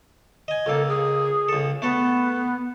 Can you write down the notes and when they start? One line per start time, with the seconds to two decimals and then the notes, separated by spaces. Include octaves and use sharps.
0.48 D#5 G#5
0.66 C#2 A#3 A4
0.88 G#4
1.49 C#2 A4
1.82 A3 B3 A4